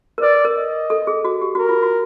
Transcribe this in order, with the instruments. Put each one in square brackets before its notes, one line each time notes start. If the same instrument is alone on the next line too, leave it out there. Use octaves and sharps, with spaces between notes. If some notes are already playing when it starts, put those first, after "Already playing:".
[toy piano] A#4
[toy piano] B4 [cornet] D5
[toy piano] A#4
[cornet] D#5
[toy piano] A4
G#4
F#4
G4
[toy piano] F#4 [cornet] A#4
[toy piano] F4
F#4